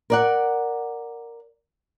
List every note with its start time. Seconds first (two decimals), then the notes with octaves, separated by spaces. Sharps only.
0.10 A#4 D5 F#5